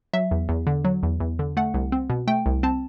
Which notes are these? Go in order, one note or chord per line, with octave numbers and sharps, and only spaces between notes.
F#3 E5
E2
E2
D3
F#3
E2
E2
D3
A3 F#5
C2
C4
B2
A3 G5
C2
C4 A5